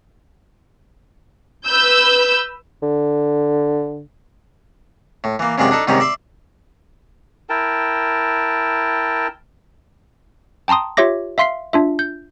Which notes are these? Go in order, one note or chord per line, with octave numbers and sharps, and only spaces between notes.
B4 E6 G6
D3
A2
E3 A#3
F#2 C3 G#3 F4 D5 C#6
D4 D#4 A4
G#2 C3 D#3 G3 C#4 D#4
D5 E5 C6
E4 A#4 G5 A5
G5 A5 A#5 C6 D#6
F4 G4 C#5 E5 D6 A#6
E5 F5 C6 B6 C7
D4 F4 E5
G6